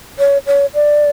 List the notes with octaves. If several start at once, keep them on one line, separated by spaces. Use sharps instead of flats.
C#5
C#5
D5